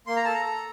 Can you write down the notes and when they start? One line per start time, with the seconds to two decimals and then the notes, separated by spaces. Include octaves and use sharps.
0.07 A#3 C6
0.16 A#5
0.25 A4 A5
0.34 A#5
0.45 A4